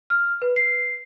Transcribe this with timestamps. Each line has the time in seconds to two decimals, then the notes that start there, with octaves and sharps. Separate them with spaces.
0.10 F6
0.42 B4
0.56 C7